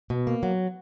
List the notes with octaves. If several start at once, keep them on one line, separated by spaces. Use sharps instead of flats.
B2
A#3
F#3